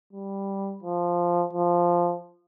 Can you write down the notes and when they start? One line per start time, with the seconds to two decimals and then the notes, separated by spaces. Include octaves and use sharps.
0.13 G3
0.83 F3
1.53 F3